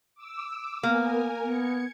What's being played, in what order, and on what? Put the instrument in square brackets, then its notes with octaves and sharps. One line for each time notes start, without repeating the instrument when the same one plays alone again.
[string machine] D6 E6
[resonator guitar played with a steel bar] A#3 [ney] B3 [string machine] A#4 G#5
[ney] B3 [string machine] G#6 C#7